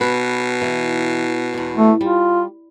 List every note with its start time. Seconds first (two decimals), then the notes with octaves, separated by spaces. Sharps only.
0.01 B2 B4
0.61 E3
1.54 E2 G2
1.77 A3
2.01 G3 F4